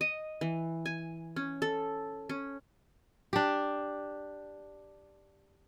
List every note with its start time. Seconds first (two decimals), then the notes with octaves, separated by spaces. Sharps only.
0.01 D#5
0.41 E3
0.86 G#5
1.36 C#4
1.62 A4
2.29 C#4
3.33 D4 G4